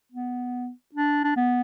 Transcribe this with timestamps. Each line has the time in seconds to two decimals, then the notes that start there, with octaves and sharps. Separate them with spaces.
0.12 B3
0.94 D4
1.24 D4
1.36 B3